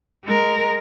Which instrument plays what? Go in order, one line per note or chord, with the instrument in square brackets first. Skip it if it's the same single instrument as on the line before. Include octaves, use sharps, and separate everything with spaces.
[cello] G#3 A#4